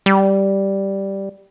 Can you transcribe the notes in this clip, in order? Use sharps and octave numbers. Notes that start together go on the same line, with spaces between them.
G3